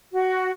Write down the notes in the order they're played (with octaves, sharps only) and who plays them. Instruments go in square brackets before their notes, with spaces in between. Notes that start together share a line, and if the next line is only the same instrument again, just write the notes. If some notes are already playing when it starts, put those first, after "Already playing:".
[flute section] F#4